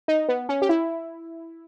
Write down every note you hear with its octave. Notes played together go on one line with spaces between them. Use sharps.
D#4
B3
C#4
G4
E4